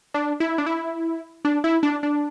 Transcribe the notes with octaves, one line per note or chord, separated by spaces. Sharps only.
D4
E4
D4
E4
D4
E4
D4
D4